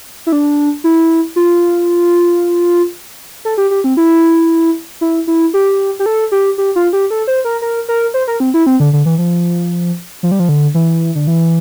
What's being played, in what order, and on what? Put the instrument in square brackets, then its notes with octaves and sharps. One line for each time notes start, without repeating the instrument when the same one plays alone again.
[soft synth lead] E4
D4
E4
F4
A4
G4
G4
C4
E4
E4
E4
G4
G4
A4
G4
G4
F4
G4
A4
C5
A#4
A#4
A#4
C5
A#4
C4
E4
C4
D3
D3
E3
F3
F3
G3
F3
D3
E3
D3
E3